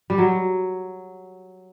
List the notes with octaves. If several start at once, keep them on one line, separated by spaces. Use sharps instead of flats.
G3
F#3